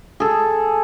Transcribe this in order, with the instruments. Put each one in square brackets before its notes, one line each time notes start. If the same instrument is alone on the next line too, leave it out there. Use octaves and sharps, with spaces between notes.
[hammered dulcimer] G#4 A4